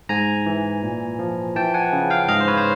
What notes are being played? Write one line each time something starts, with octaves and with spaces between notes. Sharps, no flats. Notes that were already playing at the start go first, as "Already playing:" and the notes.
G#2 G#5 A#5
E3
A#2
F3
E3 G5 A5
F#5 G#5
C#3
F5 G5
G#2 D#5 F5
C5
B4 C#5
C5